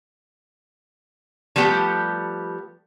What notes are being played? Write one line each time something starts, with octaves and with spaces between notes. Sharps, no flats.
F3 G3 A3 B3 G4